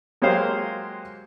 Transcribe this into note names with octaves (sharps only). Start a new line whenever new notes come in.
F#3 G#3 A#3 G4 C5 F5